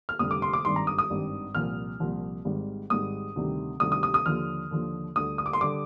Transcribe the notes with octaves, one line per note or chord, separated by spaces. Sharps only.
F6
F1 F2 D3 G3 D#6
D6
C6
D6
G#1 G2 D#3 G3 C6
A#5
D#6
D#6
G#1 G2 D#3 G3
C2 A#2 F3 F6
C2 A#2 F3
G#1 G#2 G3
G#1 G#2 G3 D#6
D2 C3 D#3 G3
D2 C3 D#3 G3 D#6
D#6
D#6
D#6
D#2 D3 F3 F6
D#2 D3 F3
D2 D3 G3 D#6
D#6
D6
C6
D3 G3 D6